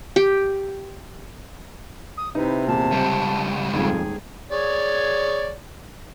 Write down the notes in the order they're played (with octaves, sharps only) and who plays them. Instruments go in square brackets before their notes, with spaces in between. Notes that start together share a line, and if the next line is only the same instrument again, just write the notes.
[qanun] G4
[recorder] D#6
[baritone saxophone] C3 [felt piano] D#4 E4 [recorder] B4
[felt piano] E2 A#2 [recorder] A5
[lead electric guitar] C#2 G3 [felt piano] C5
[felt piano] D#1 G#2 [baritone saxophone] F2 [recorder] G#4
[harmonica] G#4 C#5 D5